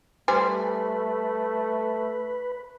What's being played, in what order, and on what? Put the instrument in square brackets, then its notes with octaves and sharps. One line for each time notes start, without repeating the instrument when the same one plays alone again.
[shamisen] G3 C5 G#5 [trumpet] A3 [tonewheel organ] B4